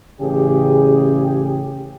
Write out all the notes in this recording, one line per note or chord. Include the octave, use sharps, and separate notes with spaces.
A1 C#3 G4 G#4